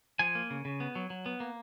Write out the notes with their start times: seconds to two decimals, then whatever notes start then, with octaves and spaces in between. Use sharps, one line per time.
0.19 F3 G#5
0.35 A#3
0.50 C#3
0.65 C#3
0.80 B3
0.96 F#3
1.10 F#3
1.26 B3
1.40 A#3